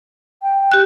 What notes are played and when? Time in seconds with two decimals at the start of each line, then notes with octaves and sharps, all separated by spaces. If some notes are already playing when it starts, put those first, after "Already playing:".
0.43 G5
0.72 G4 F#6